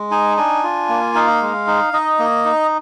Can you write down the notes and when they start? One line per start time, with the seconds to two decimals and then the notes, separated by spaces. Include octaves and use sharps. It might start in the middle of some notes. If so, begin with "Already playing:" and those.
Already playing: G#3
0.11 D#4 G#5
0.37 D4 G#5
0.63 F4
0.89 A#3
1.15 D#4 F5
1.42 G#3
1.67 D#4
1.93 D#4 D#5
2.19 A#3
2.45 D#4